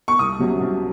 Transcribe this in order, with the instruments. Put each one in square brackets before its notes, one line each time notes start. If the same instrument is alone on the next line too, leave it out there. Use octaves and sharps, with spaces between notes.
[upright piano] C#6
C2 D#6
C3 F#3 C#4
C2